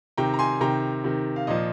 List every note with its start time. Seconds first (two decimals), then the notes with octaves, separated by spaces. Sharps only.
0.17 C3 D#3 G5 A#5
0.34 A#5
0.39 G#5 C6
0.61 C3 D#3 G5 A#5
1.04 C3 D#3
1.36 F5
1.47 A#2 F3 D#5